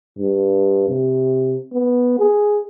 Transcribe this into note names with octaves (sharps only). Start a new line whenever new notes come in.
G2
C3
B3
G#4